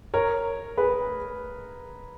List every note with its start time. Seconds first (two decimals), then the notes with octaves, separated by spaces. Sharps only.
0.14 A#4 C#5
0.77 G#4 B4